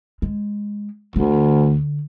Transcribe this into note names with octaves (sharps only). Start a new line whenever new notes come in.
G#3
D2 D3